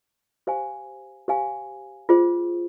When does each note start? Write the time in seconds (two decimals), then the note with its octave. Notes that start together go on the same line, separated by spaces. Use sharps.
0.47 G4 C5 F5 G#5
1.28 G4 C5 F5 G#5
2.09 F4 G#4 C5